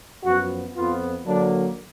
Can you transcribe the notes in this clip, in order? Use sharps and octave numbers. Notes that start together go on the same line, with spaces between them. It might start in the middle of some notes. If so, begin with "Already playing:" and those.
F#2 F3 B3 F#4
F2 F3 B3 F4
D3 F#3 A#3 D4